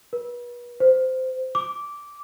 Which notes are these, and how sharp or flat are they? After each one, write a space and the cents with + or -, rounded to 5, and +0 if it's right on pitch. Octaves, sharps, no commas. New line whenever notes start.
B4 -35
C5 -15
D6 -10